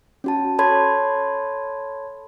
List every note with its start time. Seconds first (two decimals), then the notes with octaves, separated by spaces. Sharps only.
0.24 C#4 F#4 A5
0.59 A4 C#5 A5 B5 C6 G#6